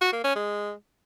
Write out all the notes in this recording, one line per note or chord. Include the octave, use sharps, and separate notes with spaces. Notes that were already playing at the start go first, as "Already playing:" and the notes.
F#4
A#3
C#4
G#3